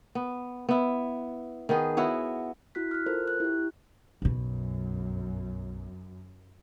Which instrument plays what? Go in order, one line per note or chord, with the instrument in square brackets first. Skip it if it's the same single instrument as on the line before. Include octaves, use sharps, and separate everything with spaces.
[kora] B3
B3 E4
D#3 B3 G#4
B3 E4 F#4 C#5
[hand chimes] E4 F#4 F#6 B6
F6 F#6
F4 A4 A#4 C5
F#6
E4 G4
[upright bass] B1 B2 [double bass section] F#2